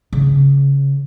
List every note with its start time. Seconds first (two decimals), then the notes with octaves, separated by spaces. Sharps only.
0.13 C#3